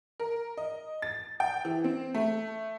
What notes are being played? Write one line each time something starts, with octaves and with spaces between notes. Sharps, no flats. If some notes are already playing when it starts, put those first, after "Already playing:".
A#4
D#5
A6
G5
E3
C4
A3